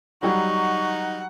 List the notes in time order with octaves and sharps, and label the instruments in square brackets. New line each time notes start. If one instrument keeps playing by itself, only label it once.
[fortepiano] F#3 G3 [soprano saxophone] D#4 [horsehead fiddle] F#5 [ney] C#6